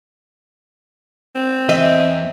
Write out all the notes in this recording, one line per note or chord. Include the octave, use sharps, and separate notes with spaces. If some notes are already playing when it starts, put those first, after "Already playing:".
C4
E2 D#5 E5